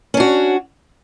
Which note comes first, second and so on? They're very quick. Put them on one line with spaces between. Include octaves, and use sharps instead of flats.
C#4 D4 F#4